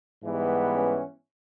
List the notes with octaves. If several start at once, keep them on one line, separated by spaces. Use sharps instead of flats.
G#2 E3 G3 B3
C#4